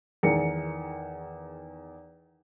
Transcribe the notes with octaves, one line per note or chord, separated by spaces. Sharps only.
E2 D#3 G#4 A#4 C#7